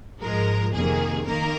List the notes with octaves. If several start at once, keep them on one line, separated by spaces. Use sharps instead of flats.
G#2 F3 G#3 A#4
F2 C3 D#3 A#3 G#4
D#3 A#3 A#4